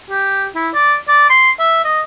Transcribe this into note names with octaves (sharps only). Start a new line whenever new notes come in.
G4
E4
D5
D5
C6
E5
D#5